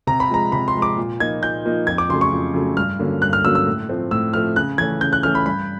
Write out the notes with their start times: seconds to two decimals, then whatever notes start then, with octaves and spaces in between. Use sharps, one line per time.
0.07 C3 A#5
0.20 B5
0.30 F3 G#3 A#5
0.52 C3 B5
0.68 C6
0.75 F3 G#3
0.82 D6
0.97 A#2
1.20 F3 A#3 D#4 G#6
1.42 A#2 G6
1.65 F3 A#3 D#4
1.87 F2 G#6
1.98 D6
2.09 C#3 F#3 A3 C6
2.21 C#6
2.32 F2
2.54 C#3 F#3 A3
2.77 G2 F6
2.99 D3 F#3 A#3 C#4
3.22 G2 F#6
3.33 F6
3.44 D3 F#3 A#3 C#4 E6
3.55 E6
3.66 A2
3.89 F3 A3 C4
4.11 A2 E6
4.34 F3 A3 C4 F6
4.56 C#3 F#6
4.78 E3 A3 C#4 G#6
5.01 C#3 G6
5.13 F#6
5.23 E3 A3 C#4 F6
5.35 B5
5.46 G2 B5